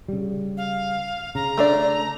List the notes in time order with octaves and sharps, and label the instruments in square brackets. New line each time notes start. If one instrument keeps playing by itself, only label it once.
[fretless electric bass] C#3 G3
[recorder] F5
[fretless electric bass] C#3 [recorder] A#5
[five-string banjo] A3 D4 D5